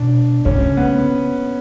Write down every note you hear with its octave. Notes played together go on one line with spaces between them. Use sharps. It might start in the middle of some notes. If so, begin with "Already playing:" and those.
Already playing: B2 D4
C#3 C#4
B3